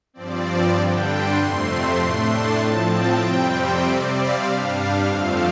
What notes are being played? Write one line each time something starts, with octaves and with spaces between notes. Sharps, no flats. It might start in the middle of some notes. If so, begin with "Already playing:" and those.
G2 F3 C4 D5
G2 D3 G3 D4 G5
C6
F2 C3 A3 C4 C6
A2 A3 D4
A5
A2 F3 C4 A5
G5
F2 C3 G3 C4
C5
C3 G3 C4 D5
F5
G2 G3 D4 F5
F2 D3 F3 A3 C4